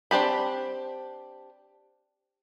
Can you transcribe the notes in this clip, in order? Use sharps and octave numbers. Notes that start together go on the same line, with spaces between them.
C4 D4 G4 B5